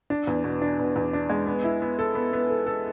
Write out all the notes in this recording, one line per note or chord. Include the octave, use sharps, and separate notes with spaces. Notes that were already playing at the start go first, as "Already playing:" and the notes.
D4
E2
B2
D4
B2
E2
D4
G#3
B3
E4
B3
A4
B3
B3
A4
A4